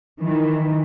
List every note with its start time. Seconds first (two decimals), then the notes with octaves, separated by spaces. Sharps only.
0.21 D#3 E3